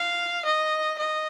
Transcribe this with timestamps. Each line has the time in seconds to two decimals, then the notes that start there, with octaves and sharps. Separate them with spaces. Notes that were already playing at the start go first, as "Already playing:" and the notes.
Already playing: F5
0.45 D#5
0.98 D#5